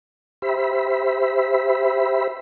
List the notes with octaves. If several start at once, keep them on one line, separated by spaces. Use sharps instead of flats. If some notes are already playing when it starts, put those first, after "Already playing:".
G4 C5 E5 B5